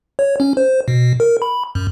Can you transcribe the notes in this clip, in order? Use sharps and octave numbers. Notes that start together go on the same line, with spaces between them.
C#5
C#4
C5
B2
A#4
B5
F#2